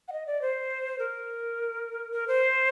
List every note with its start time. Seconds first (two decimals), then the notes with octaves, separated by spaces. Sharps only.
0.08 F#5
0.12 D#5
0.27 D5
0.42 C5
0.99 A#4
2.12 A#4
2.28 C5